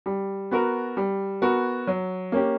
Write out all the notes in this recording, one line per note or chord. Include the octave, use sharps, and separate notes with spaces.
G3
B3 F#4 A#4
G3
B3 F#4 A#4
F#3
A#3 C#4 G4